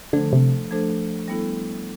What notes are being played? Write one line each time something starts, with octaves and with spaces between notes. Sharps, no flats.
D3 F3 A3 D4 A4 C5
C3
F3 A3 D4 A4 C5
G3 B3 E4 A4